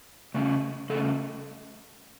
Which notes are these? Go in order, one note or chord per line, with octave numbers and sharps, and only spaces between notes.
C#3 A3 C#4
C#3 A3 C#4 A4